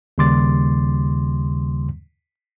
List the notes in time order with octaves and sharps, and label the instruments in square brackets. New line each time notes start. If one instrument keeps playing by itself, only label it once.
[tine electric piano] D#2 C#3 G3 C6 D6 A6